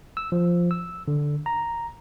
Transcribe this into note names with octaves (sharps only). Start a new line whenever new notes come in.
E6
F3
E6
D3
A#5